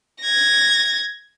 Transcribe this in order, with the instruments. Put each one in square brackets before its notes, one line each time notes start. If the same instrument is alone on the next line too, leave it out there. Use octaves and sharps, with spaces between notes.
[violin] G#6 A#6